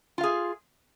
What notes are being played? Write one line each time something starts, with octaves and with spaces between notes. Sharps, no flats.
F4 G#4 F5